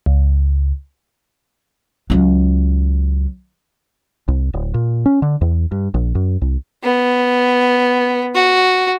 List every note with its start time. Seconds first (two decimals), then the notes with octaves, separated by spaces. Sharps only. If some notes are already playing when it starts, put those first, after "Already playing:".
0.06 C#2
2.10 C#2 F#3
4.28 C2
4.53 D1
4.74 A#2
5.06 C#4
5.22 D3
5.41 E2
5.72 G2
5.94 A#1
6.15 F#2
6.42 C2
6.84 B3
8.35 F#4